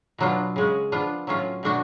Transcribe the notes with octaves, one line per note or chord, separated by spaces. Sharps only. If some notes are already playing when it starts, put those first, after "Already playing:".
B2 F#3 B3 D4 F4
C#3 G#3 C#4
F3 B3 D4 F4
A2 F#3 C#4 F4
B2 A3 D4 F#4